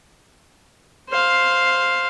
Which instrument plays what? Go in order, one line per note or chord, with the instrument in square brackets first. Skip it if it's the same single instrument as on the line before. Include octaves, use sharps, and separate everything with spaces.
[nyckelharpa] C5 F5